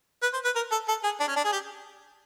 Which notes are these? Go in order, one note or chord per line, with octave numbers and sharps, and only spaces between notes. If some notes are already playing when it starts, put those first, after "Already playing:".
B4
C5
B4
A#4
A4
A4
G#4
D4
C#4
D4
G#4
G4